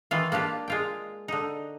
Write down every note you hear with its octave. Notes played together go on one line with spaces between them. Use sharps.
D#3 E3 F4
A#3 D4 F4 G4
G#3 F4 G5
D3 D#4